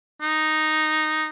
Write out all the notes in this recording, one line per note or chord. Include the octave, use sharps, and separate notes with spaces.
D#4